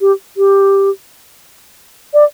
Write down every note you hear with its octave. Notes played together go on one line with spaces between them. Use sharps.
G4
G4
D5